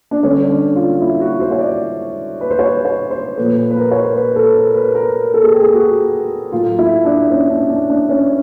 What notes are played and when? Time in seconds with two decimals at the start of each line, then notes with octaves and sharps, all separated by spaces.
0.11 D4
0.23 D3 G3 C#4
0.50 D4
0.76 F4
1.01 E4
1.21 F#4
1.41 C5
1.51 C#5
1.61 D5
2.41 B4
2.50 C5
2.59 C#5
2.85 C#5
3.11 C5
3.37 A#2 F3 A3 B4
3.71 B4
3.77 A#4
3.91 C#5
4.04 C5
4.16 B4
4.36 A4
4.55 A#4
4.75 B4
4.95 A#4
5.34 A4
5.44 G#4
5.53 G4
5.62 G#4
5.74 F#4
6.52 A2 F#3 A3 F4
6.79 E4
7.05 D4
7.31 C#4
7.50 D4
7.70 D4
7.90 D4
8.09 C#4